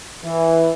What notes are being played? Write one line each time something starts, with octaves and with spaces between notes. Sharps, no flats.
E3